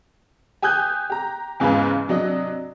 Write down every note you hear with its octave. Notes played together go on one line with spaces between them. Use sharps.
G4 G#5 D#6 F#6 G6
G4 A#5
E2 G#2 C#3 F4 B4 G#5
C3 F#3 D4 D#5